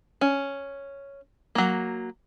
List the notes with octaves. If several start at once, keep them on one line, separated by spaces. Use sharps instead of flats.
C#4
F#3 A#3